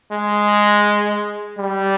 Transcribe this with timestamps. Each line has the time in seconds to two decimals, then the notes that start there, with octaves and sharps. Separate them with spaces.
0.12 G#3
1.59 G3